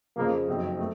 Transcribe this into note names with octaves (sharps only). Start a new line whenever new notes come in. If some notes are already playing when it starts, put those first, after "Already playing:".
F2 C#3 F3 A#3
F#1 F2 D#3 F#3 C4
A3